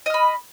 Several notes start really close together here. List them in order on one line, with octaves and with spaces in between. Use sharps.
D#5 F6 B5